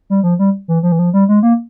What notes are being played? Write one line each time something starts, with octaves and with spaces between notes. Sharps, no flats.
G3
F3
G3
E3
F3
E3
F3
G3
G#3
A#3